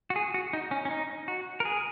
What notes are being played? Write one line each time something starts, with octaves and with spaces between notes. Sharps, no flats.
F#4
G#4
F#4
D#4
C#4
C#4
D#4
F#4
A#4
G#4